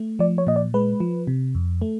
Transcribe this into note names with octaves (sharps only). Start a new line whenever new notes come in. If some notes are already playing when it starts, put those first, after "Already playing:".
Already playing: A3
F3 D5
C#5
A#2 D#5
D5
G#3 B4
F3
C3
F2
A3